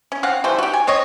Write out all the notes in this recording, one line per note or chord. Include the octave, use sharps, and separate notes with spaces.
C#4
C4 C#4 F5 F#5
E3 G3 A3 C5
F#4 G4
G#5
C4 C#4 C#5 D#5